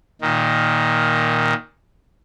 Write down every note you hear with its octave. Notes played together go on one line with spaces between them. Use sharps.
A#2 D#3